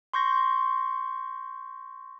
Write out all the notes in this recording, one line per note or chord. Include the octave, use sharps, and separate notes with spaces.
C6 C#6 G6 A#6